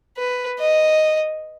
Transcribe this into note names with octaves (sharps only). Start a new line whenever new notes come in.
B4
D#5